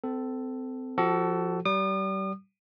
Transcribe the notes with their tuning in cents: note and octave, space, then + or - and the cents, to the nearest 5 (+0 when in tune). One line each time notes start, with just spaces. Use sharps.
C4 -30 A4 +0
F3 +0 F#4 +35 A4 +0
G3 -30 D#6 -40